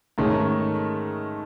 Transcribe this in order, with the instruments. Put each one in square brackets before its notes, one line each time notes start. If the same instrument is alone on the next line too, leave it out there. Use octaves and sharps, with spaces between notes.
[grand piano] G#2 D#3 A3 C#4